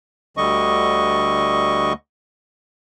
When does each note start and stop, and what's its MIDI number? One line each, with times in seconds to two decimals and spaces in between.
0.37 1.93 38
0.37 1.93 50
0.37 1.93 55
0.37 1.93 75
0.37 1.93 85